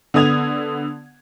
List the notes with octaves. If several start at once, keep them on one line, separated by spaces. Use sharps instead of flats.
D3 B3 D#6 G#6 F7